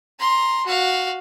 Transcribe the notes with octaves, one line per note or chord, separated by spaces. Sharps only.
A#5 C6
F#4 F5